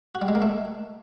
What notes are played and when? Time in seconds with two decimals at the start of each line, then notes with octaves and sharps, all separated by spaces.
0.15 F#4
0.22 G3
0.28 G#3
0.35 A#3
0.42 A3